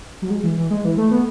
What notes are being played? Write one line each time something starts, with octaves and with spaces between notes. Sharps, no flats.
F#3
G#3
E3
E3
G#3
E3
A3
B3